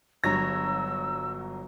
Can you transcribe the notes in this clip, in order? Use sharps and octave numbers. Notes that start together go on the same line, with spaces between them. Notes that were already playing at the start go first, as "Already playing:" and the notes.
G1 G2 F#3 C#5 A#5 E6 A#6